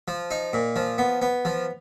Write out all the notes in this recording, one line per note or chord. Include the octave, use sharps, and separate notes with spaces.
F3
D#4
A#2
F3
B3
B3
F3